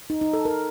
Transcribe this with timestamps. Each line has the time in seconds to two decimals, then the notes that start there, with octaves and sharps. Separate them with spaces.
0.10 D#4
0.21 D#4
0.33 A4
0.45 A#4